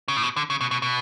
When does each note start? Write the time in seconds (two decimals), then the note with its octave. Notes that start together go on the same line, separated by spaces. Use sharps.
0.08 C#3
0.17 A2
0.23 B2
0.36 D3
0.50 C#3
0.61 B2
0.71 B2
0.82 B2